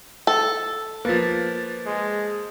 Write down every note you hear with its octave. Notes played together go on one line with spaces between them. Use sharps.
A4
F3 A#3 B4 A6 B6
G#3